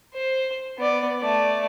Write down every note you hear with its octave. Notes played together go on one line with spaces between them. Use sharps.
C5
B3 D5
A3 D5